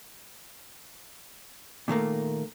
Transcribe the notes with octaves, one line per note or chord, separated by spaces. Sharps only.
A#2 D#3 A3 A#3